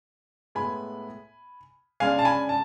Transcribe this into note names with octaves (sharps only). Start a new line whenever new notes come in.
A2 G#3 B3 G#5 B5
C#3 G#3 D4 F5 G#5
A5
G#5 B5
A5